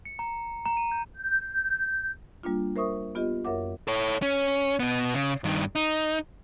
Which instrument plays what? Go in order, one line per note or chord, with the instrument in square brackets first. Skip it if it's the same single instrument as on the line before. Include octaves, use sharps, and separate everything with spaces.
[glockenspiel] C#7
A#5
A#5
D#7
G6
[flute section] G6
[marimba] G3 A#3 D4 F4
A#4 C5 E5 C#6 D#6
B3 F4 G4 D#5
F#2 A#4 C#5 E5 F#5 D6
[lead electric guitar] A4 C#5
C#4
B2 B3
C#3
G2 D#3
D#4